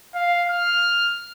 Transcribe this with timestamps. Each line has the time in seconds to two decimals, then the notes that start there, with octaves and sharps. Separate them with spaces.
0.15 F5
0.49 F6